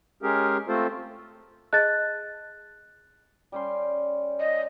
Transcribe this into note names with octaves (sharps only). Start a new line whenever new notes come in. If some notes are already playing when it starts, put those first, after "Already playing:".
G#3 C#4 G4 G#4 A#4
A3 C4 F4 A4 C5
G#4 D#5 A5 F#6 A6
G3 C#4 C6
D#5